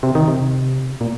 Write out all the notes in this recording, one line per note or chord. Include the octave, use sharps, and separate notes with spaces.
C3
D#3
C3
A#2